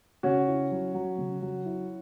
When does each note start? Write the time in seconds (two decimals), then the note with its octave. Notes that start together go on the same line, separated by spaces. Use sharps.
0.23 C#3 C#4 F#4
0.48 E4
0.72 F#3
0.94 F#3
1.18 C#3
1.42 F#3
1.66 E4